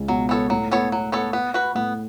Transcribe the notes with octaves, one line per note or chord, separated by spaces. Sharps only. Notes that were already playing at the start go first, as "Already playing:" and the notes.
Already playing: C#2 C#3
B2 F#3
B3 A4 C#5
A2 F#3
B3 A4 C#5
F#3
B3 A4 C#5
B3
F#4 B4
A2 B3